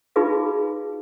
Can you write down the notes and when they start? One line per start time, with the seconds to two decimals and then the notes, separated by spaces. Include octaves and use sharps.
0.16 D#4 F4 F#4 G#4 B4 F5